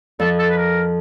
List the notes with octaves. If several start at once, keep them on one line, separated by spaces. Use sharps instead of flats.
F2 A4
A4
B4
A#4